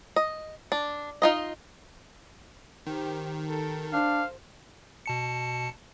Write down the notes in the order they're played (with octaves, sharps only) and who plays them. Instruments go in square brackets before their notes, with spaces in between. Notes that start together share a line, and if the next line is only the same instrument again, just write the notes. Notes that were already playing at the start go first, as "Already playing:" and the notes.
[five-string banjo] D#5
D4
D#4 F4 D#5
[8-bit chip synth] D#3 [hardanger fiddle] G4 C5
[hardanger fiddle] A4 A#4
[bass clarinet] D4 [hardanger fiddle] C5 [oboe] F5
[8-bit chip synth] B2 A5 C#7